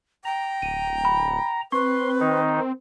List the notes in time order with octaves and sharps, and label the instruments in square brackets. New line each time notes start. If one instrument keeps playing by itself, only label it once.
[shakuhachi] G5 [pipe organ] A#5
[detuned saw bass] D1 [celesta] D#7
[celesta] B5
[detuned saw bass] C4 [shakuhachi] B4 [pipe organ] C6 [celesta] C#6
[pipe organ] D#3 D#4